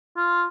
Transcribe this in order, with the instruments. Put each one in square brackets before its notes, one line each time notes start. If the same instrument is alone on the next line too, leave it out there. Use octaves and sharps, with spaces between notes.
[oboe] F4